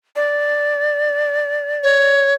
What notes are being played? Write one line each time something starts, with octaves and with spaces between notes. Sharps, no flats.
D5
C#5